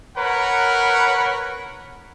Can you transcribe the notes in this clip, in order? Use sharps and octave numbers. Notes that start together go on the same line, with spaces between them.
A#4 B4 C#5 F#5